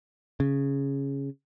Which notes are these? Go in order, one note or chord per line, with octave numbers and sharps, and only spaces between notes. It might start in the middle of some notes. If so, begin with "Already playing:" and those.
C#3